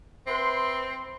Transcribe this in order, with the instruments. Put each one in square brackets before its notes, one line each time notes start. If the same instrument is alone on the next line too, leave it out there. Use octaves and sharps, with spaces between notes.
[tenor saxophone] C4 [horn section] B4 E5 C6